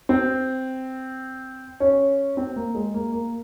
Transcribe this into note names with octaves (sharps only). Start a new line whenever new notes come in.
C4
C#4
C4
A#3
G#3
A#3
A#3